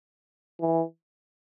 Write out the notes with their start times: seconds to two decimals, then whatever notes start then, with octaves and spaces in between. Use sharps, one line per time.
0.61 E3